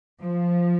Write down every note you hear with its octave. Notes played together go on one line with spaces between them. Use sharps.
F3